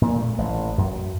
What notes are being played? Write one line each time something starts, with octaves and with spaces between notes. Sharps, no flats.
A#2
A3
A1
F#2